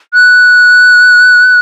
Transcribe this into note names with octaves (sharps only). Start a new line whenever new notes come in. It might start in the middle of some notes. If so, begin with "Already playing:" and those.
F#6